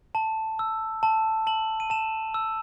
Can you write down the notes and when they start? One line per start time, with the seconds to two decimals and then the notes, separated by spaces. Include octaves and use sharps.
0.15 A5
0.59 E6
1.03 A5
1.47 A5 F#7
1.80 D#7
1.90 A5 E7
2.34 E6